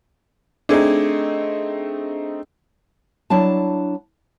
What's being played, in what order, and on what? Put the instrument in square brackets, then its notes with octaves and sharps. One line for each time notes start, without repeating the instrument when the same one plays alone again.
[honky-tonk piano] A3 C4 D#4 [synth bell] D4 G#4
[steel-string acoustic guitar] F#3 D4 E4 A5